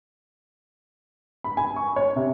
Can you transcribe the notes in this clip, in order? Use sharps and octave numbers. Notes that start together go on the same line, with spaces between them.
B5
G#5
C#6
C#5
C3